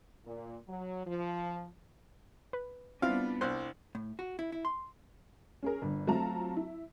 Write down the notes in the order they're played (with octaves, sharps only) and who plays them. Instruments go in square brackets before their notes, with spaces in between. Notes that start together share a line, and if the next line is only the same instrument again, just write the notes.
[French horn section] A#2
F#3
F3
[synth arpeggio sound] B4
[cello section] G3 B3 D4 [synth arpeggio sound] C4 E4 F4 [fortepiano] F5
[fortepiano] C2 C5 C6 [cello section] D4 [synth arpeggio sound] F#6
[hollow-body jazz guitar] A2
F#4
E4
E4
C6
[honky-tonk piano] C#4 G#4 A#4
G1 D4
F#3 A3 C4 F4 A5 A#5
E4